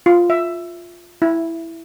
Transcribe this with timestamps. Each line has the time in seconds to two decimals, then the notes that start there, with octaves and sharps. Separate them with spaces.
0.06 F4
0.30 E5
1.22 E4